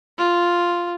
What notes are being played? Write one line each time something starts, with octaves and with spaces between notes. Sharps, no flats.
F4